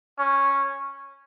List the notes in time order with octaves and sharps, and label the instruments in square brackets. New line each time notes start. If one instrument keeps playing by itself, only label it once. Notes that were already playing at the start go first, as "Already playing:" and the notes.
[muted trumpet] C#4